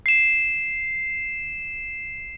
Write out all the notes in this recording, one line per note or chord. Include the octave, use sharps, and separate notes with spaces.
C7 E7